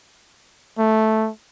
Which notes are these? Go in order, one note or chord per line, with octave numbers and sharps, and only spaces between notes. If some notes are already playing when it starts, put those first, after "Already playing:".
A3